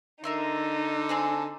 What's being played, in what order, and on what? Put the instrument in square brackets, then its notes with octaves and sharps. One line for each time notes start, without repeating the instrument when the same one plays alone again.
[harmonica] D3 [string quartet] D#4 [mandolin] A#4 E5 C6
[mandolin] C4 G#4 A4